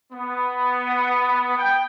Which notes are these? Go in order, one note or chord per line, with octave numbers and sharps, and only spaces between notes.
B3
G5